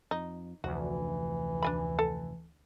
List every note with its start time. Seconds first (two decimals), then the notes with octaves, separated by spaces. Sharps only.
0.11 F2 D#4
0.64 F1 D2 E3 F#4
1.62 D4 G#5 B5
1.99 A4